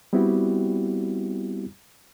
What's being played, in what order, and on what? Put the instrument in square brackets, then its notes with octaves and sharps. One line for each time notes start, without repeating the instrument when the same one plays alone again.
[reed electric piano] G3 B3 C4 E4 F#4 G4